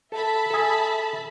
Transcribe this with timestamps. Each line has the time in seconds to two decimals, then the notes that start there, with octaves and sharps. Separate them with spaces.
0.12 A4 E5 A5 B5
0.50 G#4 A4